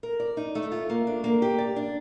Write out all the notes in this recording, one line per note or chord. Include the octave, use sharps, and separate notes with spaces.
A#4
D5
D#4
A3
F4
A#3
D4
A#3
G4
D5
D4